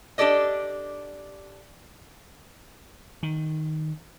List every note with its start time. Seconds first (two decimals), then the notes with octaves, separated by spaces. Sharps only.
0.18 D4 G4 A4 D5 D#5
3.23 D#3